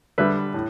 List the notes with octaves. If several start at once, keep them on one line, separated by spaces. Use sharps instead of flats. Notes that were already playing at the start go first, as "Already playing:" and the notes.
D3 G3 B4 E5
A2